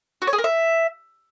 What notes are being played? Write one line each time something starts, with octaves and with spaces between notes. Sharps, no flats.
F#4
C#5
G#4
A#4
E5